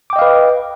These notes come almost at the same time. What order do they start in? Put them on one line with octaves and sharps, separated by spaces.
D6 G5 D#5 F5 B4